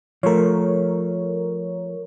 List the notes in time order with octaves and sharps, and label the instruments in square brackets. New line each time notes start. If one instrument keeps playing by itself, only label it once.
[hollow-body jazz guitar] F3 A3 [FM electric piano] A#4 C#5